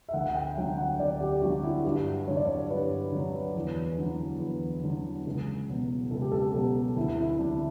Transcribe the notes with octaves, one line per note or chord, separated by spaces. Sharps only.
E5
D2 F#5
F#5
G5
D3 F#3 G5
F#5
D2 D5
G4
D3 F#3 F#4
E4
G2 F#4
D3 F#3 C#5
D5
C#5
G2 B4
D3 F#3
E2
D3 F#3
E2
D3 F#3
C#2
B2 F#3
C#2 A4
G4
A4
G4
B2 F#3 A4
D2 E4
E4
D3 F#3 D4